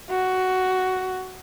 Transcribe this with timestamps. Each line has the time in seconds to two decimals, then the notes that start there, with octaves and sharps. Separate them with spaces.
0.10 F#4